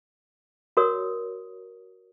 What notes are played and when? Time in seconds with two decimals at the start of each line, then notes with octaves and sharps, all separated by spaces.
0.77 F#4 A#4 C#5 D5 D#6